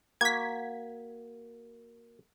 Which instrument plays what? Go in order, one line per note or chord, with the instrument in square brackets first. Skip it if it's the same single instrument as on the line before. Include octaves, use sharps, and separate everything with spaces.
[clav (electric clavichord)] A#3 F#4 [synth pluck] G#6 B6